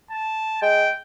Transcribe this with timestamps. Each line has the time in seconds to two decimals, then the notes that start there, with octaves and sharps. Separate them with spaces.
0.10 A5
0.62 G#3 G5